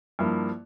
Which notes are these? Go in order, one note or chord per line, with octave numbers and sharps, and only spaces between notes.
G2 F3 A#3 E4